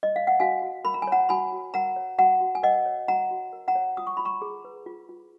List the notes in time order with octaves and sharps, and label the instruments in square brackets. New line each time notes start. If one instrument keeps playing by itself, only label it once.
[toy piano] D#5
F5
F#5
F#4 F5 G#5
F#4
A#4 B5
A#5
G#5
C#5 F#5 A#5
F#4 G#5 B5
F#4
A#4 F#5 A#5
C#5
F#4 F#5 A#5
F#4
G#5
A#4 D#5 F#5
C#5
F#4 F#5 A#5
F#4
A#4
F#5 A#5
C#5
F4 D#6
C#6
F4 B5
A#5 C#6
G#4
B4
F4
F4